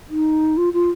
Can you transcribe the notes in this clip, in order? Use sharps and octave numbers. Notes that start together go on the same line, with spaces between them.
D#4
F4
F4